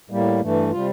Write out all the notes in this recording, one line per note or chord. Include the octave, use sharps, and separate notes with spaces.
A2 G3 A#3
G2 E3 A3
C3 G3 F4